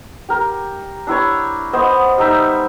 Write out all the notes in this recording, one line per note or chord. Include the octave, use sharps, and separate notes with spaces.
G4 A#4
D4 E4 G4 C#5
B3 C5 D#5
G3 D#4 E5